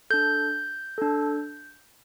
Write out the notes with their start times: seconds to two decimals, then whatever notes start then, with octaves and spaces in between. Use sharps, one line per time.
0.10 D4 A4 G6
0.98 D4 A4